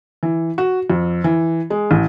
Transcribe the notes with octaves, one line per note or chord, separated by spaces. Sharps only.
E3
F#4
F2
E3
G#3
A1